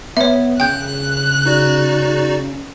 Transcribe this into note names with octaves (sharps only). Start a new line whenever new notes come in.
B3 C#5 E5
C#3 G5 F#6 G6
D#4 F#4 D5